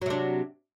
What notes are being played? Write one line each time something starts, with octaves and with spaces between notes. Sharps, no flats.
C3 F#3 D4